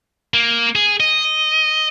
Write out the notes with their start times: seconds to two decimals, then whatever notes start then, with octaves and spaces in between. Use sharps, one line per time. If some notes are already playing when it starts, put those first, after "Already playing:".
0.34 A#3
0.75 G#4
1.00 D#5